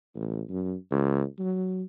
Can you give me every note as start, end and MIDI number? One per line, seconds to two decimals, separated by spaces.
0.16 0.41 33
0.50 0.75 42
0.91 1.23 37
1.39 1.83 54